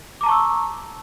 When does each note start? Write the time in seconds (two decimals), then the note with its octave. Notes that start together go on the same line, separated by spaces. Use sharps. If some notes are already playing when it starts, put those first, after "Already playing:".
0.21 D6
0.23 A#5
0.26 A5
0.29 C#6
0.31 E6